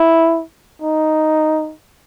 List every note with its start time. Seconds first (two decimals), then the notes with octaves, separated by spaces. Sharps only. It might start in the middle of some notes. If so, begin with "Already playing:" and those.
Already playing: E4
0.82 D#4